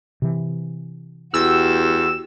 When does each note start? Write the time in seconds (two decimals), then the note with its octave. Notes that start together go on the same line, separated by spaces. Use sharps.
0.22 C3 E3
1.34 E2 F#4 G4 E6